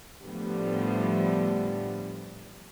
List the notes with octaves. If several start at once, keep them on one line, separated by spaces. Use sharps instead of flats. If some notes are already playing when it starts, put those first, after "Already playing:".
A2 D3 F3 G3 A3 B3